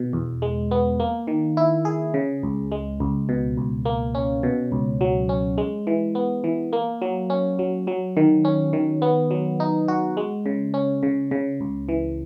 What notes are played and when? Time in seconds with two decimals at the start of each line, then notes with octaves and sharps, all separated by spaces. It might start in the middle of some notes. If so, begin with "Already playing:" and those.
Already playing: B2
0.13 E2
0.42 G#3
0.71 B3
1.00 A#3
1.27 D#3
1.57 E4
1.85 G#4
2.14 C#3
2.43 C#2
2.72 G#3
3.00 C#2
3.29 B2
3.57 C#2
3.85 A#3
4.15 C#4
4.43 B2
4.72 C#2
5.01 F#3
5.29 C#4
5.58 G#3
5.87 E3
6.15 B3
6.44 E3
6.73 A#3
7.02 F#3
7.30 C#4
7.59 F#3
7.87 F#3
8.17 D#3
8.45 C#4
8.73 D#3
9.02 B3
9.31 F#3
9.60 D#4
9.88 F#4
10.17 G#3
10.46 C#3
10.74 C#4
11.03 C#3
11.31 C#3
11.61 C#2
11.89 E3